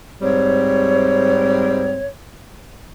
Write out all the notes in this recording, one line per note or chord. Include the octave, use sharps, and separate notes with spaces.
G#2 G3 C4 C#5